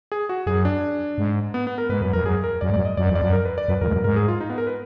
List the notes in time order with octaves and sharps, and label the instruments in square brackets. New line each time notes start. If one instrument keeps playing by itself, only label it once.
[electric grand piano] G#4
F#4
[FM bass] F#2 [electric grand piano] G#4
[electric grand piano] D4
[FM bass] G#2
[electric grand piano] B3
B3
A#4
[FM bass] G#2 [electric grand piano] B4
[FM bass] F#2 [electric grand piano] B4
[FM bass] F2 [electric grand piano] A#4
[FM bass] F#2 [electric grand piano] G#4
[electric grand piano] A#4
[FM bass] F#2 [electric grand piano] D5
[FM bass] G#2
[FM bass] F#2 [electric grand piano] D5
[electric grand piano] D#5
[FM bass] F#2 [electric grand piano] D5
[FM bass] F2
[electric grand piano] D5
[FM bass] F#2
[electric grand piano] A#4
B4
D5
[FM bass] F#2 [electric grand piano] B4
[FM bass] F2 [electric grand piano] A#4
[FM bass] G#2
[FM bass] F#2 [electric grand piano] A#4
[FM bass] G#2 [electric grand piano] A#4
[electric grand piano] G#4
F4
D#4
B3
A#4
B4